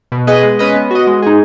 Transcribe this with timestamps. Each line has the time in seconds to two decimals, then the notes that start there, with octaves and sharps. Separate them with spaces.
0.12 B2
0.27 B3 G#4 B4 D#5
0.43 G#3
0.59 C#4 B4 D#5
0.75 B3
0.91 F#4 D#5
1.07 G#3
1.22 D#4 G#4